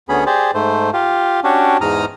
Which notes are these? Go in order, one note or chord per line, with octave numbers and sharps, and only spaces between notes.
D2 B3 C#4 G#4 B5
G4 G#4 C5 D5
G#2 A3 C5
F4 G4
C#4 D4 F#4 G4
E2 G#2 A#5 D#6 F6